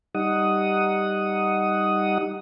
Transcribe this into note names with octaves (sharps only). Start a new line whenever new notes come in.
G3 D#4 F#5 D#6